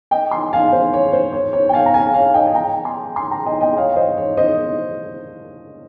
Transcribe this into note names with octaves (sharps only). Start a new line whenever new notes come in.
D#5 G5
G#5 C6
F5 G#5
C5
C#5
C5
C#5
C#5
G5
F5 G#5
A#5
F5 G#5
C#5 F5
D#5 G5
G#5
G5 A#5
G#5 C6
G#5 C6
G5 A#5
D#5 G5
D#5 G5
C#5 F5
C5 D#5
C#5
C5 D#5